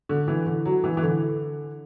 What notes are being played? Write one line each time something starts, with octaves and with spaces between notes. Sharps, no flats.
D3
E3
D3
F#3
E3
E3
D3